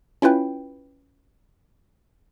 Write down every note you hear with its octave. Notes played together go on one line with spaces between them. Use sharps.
C#4 E4 F4 B4 G5